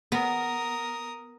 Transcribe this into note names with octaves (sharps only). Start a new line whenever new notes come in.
B3 A#4 D#6